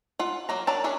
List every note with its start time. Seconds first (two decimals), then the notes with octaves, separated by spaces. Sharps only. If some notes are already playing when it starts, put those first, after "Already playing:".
0.19 F4 F#5
0.49 F#3 A#3 A#5
0.67 F#3 D4 A#4 A5
0.84 C#4 D4 G#4